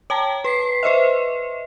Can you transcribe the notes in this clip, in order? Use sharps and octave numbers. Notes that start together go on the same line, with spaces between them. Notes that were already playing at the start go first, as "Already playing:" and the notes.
C#5 G5 A5 A#5
B4 B6 C7
B4 C5 D#5 E5